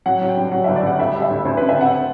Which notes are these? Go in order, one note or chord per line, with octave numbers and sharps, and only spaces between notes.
F#3 F#5
F#3
G5
G2
F#3 F#5
G1 E5
D5
G2 F#5
D2 E5
G3
E5
D2
D2 C5
D3 B4
E5
C4 F#5